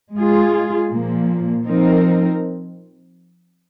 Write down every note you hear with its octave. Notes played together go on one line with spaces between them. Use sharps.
G#3 F4 G#4
A#2 F3 A#3
F3 C4 D#4 A#4